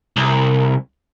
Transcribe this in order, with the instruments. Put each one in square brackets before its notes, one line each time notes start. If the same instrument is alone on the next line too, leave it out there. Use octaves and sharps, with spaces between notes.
[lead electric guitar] C2